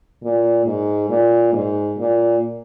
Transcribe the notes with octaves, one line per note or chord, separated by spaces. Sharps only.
A#2
G#2
A#2
G#2
A#2